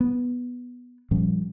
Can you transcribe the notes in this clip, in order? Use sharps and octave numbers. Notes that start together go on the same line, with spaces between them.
B3
A#2 F3 G3 C#4